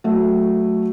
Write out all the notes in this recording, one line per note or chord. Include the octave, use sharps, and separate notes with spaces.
F#3 A3